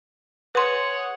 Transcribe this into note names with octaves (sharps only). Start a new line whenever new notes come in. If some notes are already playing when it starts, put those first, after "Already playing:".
G#4 B4 C#5 F#5 C6